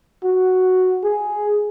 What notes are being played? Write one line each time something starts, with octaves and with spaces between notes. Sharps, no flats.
F#4
G#4